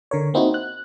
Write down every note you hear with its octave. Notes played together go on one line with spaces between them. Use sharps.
D3 A#4 C#5
A#3 C4 D#4 E4 F#4
F#6